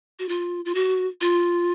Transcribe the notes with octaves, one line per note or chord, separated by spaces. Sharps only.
F#4
F4
F4
F#4
F4